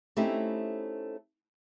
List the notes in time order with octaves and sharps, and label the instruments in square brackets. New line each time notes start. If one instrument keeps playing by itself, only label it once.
[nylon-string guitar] A3 C4 C#4 D#4 E4 G4